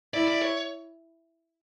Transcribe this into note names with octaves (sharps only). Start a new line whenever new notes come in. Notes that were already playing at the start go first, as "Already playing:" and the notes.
E4 D5
D5
C#5